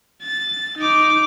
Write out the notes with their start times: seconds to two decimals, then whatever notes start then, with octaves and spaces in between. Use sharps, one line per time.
0.22 A6
0.78 D#4 D6